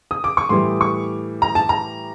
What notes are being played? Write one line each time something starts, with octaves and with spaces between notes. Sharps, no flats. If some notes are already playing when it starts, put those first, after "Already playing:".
D#6
D6
C#6
A2 E3 G3 C6
C#6
A#5
A5
A#5